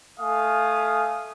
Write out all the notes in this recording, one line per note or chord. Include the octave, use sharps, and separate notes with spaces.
A3 F5 G#5 D#6